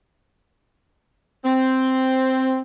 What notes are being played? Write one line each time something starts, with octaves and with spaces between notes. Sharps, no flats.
C4